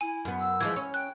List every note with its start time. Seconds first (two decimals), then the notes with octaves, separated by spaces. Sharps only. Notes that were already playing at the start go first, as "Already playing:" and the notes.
0.01 E4 G#5
0.25 F#2 B3
0.40 E6
0.61 E3 F3 G#3 G#6
0.76 C#4
0.94 G5 F#6